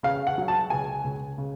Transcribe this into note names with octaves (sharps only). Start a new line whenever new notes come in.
C#3 F5
F#5
F#3
A5
C#2 G#5
C#2
C#3